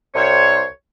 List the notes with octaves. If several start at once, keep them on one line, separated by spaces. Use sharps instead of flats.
C2 C5 C#5